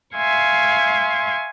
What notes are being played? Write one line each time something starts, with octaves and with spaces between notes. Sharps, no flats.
E5 F5 G#5 C6 C#6